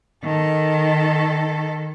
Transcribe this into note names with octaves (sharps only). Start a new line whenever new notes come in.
D#3 A4